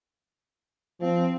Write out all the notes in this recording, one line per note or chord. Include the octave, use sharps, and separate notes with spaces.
F3 C4